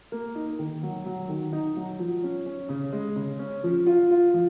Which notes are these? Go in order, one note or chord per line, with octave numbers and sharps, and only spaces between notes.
A#3
D#4
D#3
F#3
F#3
D#3
D#4
F#3
F3
C#4
C#4
C#3
G#3
C#3
C#4
F3
F4
F4
F3